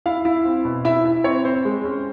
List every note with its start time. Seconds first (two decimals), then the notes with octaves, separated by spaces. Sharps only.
0.06 E4 F5
0.25 E4
0.45 C4
0.65 B2
0.85 E4 E5
1.05 E4
1.24 C4 C#5
1.44 C4 C5
1.65 G#3
1.84 C#4